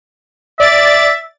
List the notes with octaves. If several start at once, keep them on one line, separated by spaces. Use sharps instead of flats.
D5 E5 A6